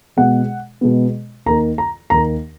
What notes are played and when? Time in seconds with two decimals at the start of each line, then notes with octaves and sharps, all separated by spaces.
0.17 B2 G#3 B3 F#5
0.81 B2 G#3 B3
1.46 D#2 D#3 A#3 A#5
1.78 A#5
2.10 D#2 D#3 A#3 A#5